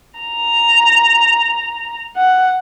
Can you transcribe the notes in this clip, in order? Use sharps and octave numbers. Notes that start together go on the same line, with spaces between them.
A#5
F#5